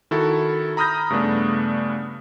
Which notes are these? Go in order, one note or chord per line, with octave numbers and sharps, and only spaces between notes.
D#3 E4 F#4 A4
A#5 B5 D#6 F6 G6 A#6
G2 C#3 A3 B3 D4